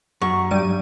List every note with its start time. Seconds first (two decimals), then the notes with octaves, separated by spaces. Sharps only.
0.21 F#2 C#6
0.51 G2 G3 D#7